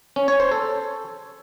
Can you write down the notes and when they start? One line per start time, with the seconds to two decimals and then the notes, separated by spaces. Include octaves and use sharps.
0.16 C#4
0.28 C#5
0.40 C5
0.52 A4